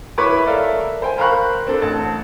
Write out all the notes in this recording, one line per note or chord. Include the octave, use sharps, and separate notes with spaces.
E4 B4 C#5 E5 C#6 D6
A4 A#4 D5 E5 F5
C5 G5 G#5
A#4 C5 F5 B5 C#6 F#6
C4 D4 A4
A1 A5